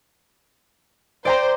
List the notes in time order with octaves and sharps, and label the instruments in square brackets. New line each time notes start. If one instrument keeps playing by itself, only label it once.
[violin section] C5 [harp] D5 G5 A#5